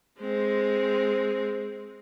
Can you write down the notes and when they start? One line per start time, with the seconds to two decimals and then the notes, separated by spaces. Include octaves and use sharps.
0.20 G#3 C4